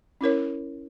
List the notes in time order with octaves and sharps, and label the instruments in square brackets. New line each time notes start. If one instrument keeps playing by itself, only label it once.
[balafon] C#4 E4 A#4 C#5